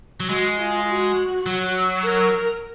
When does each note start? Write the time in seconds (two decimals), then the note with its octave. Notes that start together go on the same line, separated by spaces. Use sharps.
0.20 F#3
0.29 G#3 F#4
0.58 F4
0.87 F#4
1.46 F#3
2.05 A#4